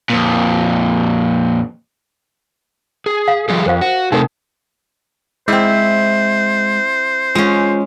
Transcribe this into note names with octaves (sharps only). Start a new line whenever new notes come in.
F2 A#2
G#4
F5
F3 G3 G#4
F2 A#4 C5 F5
F#4
C3 A3 D#4 A#4
G#3 C4 E4 C5
G#3 C#4 F4